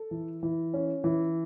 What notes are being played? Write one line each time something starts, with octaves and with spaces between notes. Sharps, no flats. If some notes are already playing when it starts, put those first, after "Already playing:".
Already playing: A4
E3
E3
C#4
E3